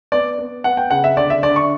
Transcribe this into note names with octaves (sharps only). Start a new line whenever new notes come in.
B3 D5
B3
B3 F#5
G5
C#3 F#5
E5
D3 D5
E5
D3 D5
C#6